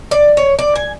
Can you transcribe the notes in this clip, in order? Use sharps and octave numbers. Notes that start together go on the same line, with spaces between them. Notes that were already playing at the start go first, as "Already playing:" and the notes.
D5
C#5
D5
G#5